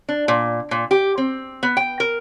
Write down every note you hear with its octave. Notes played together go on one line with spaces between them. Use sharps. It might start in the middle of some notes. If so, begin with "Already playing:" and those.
D4
A#2
A#2
G4
C4
B3
G5
A#4